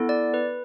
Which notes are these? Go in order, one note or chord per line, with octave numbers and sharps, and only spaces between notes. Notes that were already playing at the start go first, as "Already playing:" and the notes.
Already playing: B3 E4 A4
D5
B4